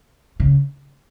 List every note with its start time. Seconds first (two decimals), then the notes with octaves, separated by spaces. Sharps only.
0.40 C#3